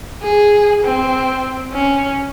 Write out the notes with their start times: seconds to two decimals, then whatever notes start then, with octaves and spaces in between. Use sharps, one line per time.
0.23 G#4
0.84 C4
1.73 C#4